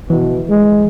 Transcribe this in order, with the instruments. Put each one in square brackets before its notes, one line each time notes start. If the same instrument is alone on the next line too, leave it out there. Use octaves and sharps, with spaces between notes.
[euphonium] B2 [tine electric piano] E3
[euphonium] G#3